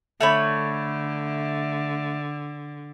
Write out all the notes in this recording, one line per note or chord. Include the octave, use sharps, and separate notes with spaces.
D3 A3 C#5 B5